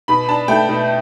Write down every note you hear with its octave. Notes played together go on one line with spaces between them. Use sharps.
B2 B5
D4 A5
A3 G5
B2